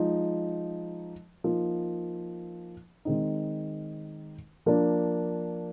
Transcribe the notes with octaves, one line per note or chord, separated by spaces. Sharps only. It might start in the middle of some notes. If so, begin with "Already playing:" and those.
Already playing: F3 G#3 D#4
F3 A#3 D#4
D#3 G#3 C4 D#4
F3 A#3 D4